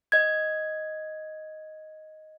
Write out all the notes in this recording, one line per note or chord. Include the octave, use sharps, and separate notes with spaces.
D#5 G#6